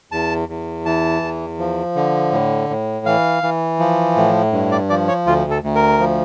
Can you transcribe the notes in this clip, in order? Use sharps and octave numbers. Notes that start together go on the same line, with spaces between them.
E2 A5
E2
E3 A5
E2
F3
D3
A2
A2
E3 F5
E3
F3
A2
G2
D5
F3 D5
C#5
D2 F4
A4
D2
A#4
F3